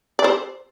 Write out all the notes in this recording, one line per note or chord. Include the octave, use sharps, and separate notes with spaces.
D5
C5